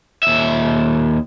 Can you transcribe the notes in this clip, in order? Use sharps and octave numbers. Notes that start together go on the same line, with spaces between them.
D#2 E5